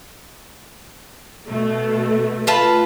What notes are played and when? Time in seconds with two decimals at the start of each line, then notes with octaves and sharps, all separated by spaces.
1.49 B2 A3
2.47 F4 B4 A5